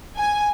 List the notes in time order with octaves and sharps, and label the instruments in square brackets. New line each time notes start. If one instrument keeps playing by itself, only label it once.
[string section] G#5